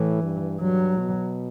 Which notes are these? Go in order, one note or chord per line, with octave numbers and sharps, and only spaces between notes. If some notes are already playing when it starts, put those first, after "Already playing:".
Already playing: A2 E3
G2
G2 F#3
B2